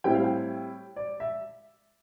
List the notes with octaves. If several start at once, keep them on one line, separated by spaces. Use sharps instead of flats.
A2 G3 C4 E4 G5
F5
G5
D5
E5